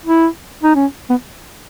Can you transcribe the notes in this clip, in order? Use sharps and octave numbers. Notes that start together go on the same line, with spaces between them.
E4
D#4
C#4
B3